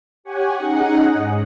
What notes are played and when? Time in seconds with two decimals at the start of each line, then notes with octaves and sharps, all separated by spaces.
0.24 G4 C#5 F#5 G#5
0.56 C#4 D#4 G#4 D#5 F#5
1.13 G#2